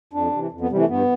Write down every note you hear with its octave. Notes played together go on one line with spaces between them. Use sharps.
F2 D4
C3 E3
F2
B3
C3 E3 G3
A3
G2 B3